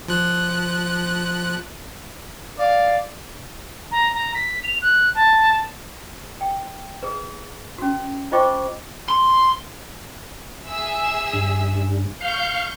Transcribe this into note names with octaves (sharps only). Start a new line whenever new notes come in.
F3 F#6
D5 F5
A#5
A#5
B6
F7
F#6
A5
G5
G#4 B4
C#4 F#4
F4 C5 D#5 G5 C#6 D6
C6
G#4 E5 E6
G2
F5 C#6 G6